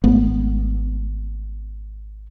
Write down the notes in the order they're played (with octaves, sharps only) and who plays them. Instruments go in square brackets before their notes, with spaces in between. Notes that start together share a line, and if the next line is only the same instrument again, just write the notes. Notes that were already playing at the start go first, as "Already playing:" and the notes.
[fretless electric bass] G#1 A3 B3